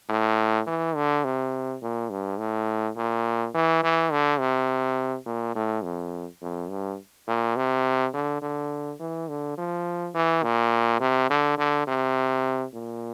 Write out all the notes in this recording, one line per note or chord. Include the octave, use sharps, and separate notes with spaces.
A2
E3
D3
C3
A#2
G2
A2
A#2
E3
E3
D3
C3
A#2
A2
F2
F2
G2
A#2
C3
D3
D3
E3
D3
F3
E3
A#2
C3
D3
D3
C3
A#2